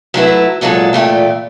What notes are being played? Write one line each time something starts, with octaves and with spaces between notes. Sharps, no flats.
F#3 A3 E4 B4
E2 A#2 F#3 G#3 A4
E2 A#2 A3 G5